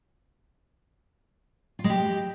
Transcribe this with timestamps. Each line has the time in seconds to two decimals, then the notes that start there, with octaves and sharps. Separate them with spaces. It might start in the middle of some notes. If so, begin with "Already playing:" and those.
1.79 F4
1.84 G#3
1.90 G4